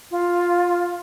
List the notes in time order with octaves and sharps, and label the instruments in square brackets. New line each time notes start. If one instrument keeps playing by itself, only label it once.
[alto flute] F4